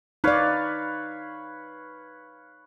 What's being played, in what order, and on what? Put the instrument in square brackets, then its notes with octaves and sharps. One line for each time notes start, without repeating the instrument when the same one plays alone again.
[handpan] D#4 D5 [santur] B4 C#5 F5